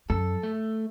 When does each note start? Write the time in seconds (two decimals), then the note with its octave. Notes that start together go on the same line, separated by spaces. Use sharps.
0.10 F#2 A4
0.43 A3